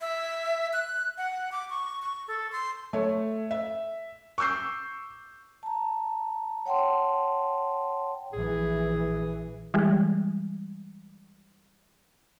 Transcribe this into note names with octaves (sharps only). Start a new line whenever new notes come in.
E5
F#6
F#5
D6
C#6
C#6
A4
C6
A3 C#5
E5
C#6 D6 E6 G6 C7
A5 A#5
C#5 F#5 G5 A5 C6
A#1 E3 G#4
E3 G3 G#3